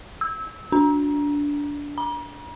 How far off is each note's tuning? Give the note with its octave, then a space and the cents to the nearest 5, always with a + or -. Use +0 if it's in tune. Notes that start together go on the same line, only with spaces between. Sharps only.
E6 -20
D4 -15
A#5 +45